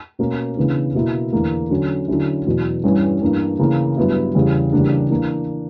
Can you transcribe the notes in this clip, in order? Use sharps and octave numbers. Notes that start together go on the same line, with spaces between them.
B2 A#3 C#4
C#3 E3 B3 D4
B2 A#3 E4
E2 D3 A#3
D3 F#3 C#4
D3 F#3 C#4 E4
E2 B2 F#3
G2 E3 G3 C#4
G2 E3 A#3 D4
C#3 E3 A#3
G2 F#3 B3 E4
E2 C#3 G3
E2 C#3 G3 A#3 D4
E3 A#3 D4